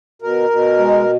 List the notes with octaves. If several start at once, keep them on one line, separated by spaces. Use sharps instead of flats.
B2 A#4
B2
G#3